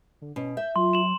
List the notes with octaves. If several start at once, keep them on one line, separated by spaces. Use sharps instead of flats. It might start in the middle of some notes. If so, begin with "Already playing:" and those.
D3
B2 C#4
E5 G6
F#3 F4 C6
E7 F#7